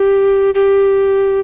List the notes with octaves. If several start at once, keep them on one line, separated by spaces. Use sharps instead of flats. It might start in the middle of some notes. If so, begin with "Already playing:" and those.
Already playing: G4
G4